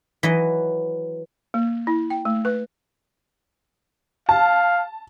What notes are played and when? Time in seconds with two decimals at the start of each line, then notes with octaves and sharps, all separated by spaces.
0.23 E3 F#3 D#5
1.54 A#3
1.87 E4
2.10 G5
2.25 A3
2.45 B4
4.29 F5 A5